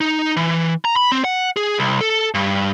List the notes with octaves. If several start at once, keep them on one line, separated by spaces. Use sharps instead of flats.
D#4
E3
A#5
B5
C4
F#5
G#4
C2
A4
G2